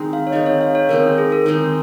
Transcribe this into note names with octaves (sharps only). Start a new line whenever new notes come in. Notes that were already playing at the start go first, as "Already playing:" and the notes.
Already playing: D#3 G#3 C4 D#4
F5
C#5
D#3 G#3 C4 D#4 D#5
C#5
F5
C#5
D#3 G#3 C4 D#4 A#4
G#4
A#4
D#3 G#3 C4 D#4